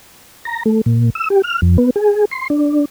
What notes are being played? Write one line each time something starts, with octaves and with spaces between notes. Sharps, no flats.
A#5
A3
A#2
E6
G4
F6
F2
B3
G#4
C6
D4